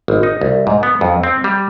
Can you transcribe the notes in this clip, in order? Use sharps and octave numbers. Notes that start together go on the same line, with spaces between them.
G#1
D#4
C2
G#2
B3
F2
C4
G3